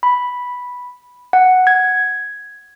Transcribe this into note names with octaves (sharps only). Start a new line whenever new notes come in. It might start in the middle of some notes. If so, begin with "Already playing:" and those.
B5
F#5
G#6